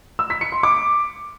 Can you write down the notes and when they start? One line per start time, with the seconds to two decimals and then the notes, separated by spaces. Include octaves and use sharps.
0.19 E6
0.30 B6
0.41 C#7
0.52 C6
0.63 D6